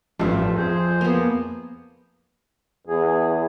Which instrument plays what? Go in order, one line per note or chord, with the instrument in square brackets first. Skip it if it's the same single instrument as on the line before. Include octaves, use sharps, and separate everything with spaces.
[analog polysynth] A1 G2 A3 [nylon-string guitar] F3 E5
[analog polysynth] F2 [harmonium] G#4 C5
[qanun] A#3 B3
[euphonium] E2 [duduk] G#4